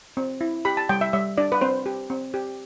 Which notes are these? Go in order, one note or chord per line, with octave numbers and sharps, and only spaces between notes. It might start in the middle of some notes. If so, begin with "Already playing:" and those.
C4
E4
G4 B5
A5
G3 G5
E5
G3 E5
D4 D5
B4
C4 C5
G4
C4
G4